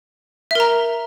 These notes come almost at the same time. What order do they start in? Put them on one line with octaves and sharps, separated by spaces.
E5 A#4 A#5